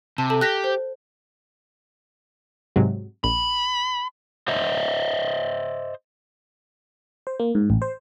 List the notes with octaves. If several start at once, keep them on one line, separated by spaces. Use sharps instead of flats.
C3 A5
A4 A5
G4 F#6 A#6 B6
C5
G#2 C3 F#3
A#1 B5
C5 D#5 E5
C5
A#3
G#2
A1
C5